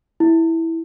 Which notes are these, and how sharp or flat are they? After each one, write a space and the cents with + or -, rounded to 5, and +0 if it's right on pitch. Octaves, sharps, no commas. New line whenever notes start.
E4 -10